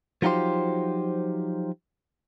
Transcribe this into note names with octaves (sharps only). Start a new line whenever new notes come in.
F3 F#3 D#4 F4 G4 C5